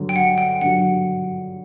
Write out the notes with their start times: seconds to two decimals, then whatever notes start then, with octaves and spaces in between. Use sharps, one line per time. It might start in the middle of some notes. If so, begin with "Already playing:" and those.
Already playing: G2 D3 F#3
0.09 G5
0.16 F#5
0.38 G5
0.61 G2 D3 F#3 F#5